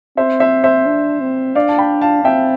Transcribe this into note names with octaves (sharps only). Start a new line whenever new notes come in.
C4 C5 E5
C5 E5
C5 E5
D4
C4
D4 D5 F5
A5
G5 B5
F5 A5
C4 E5 G5